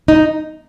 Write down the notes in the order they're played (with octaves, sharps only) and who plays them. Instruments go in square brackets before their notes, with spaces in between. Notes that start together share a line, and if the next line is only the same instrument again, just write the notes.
[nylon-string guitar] D#4